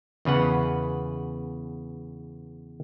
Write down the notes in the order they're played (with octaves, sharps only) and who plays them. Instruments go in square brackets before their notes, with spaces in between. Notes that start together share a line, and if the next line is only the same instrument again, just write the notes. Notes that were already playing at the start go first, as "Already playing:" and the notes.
[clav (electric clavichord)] E2 C#3 B4 F#5